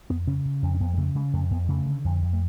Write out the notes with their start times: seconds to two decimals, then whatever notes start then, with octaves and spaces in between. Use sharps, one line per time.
0.10 F2 B3
0.27 C#3 C#4
0.45 C#3
0.63 F2 C#4
0.75 C#4
0.80 F2 B3
0.93 G#3
0.98 C#3 A3
1.15 C#3 G#3
1.33 F2 A3
1.51 F2 B3
1.69 C#3 A3
1.86 D3
2.05 F2
2.22 F2
2.33 A3